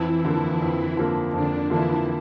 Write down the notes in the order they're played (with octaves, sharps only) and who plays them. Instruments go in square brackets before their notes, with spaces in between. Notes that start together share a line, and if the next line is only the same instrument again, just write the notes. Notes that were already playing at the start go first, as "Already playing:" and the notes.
Already playing: [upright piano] F2 [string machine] E3 E4
[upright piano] D3 F3 A#3
F2
D3 F3 A#3
[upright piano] F2 [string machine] D3 D4
[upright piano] D3 F3 A#3 [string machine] E3 E4